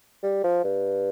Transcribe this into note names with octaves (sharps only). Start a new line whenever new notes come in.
G3
F3
G2